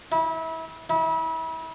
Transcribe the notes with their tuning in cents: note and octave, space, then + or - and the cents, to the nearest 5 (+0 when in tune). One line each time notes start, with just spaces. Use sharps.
E4 -30
E4 -35